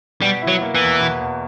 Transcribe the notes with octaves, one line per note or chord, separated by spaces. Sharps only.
B2 G3
E4
F#3
A#3
E3
E2
B2
E2